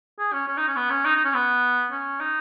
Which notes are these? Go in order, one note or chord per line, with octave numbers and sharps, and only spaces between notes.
G#4
C#4
C#4
D#4
C#4
B3
C#4
D#4
D#4
C#4
B3
C#4
D#4